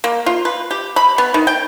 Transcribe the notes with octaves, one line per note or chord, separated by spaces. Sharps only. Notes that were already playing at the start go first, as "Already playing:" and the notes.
A#3
F4
B4
G4
B5
B3
D#3
G5